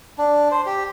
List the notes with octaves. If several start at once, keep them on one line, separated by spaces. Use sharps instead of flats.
D4
C5
G4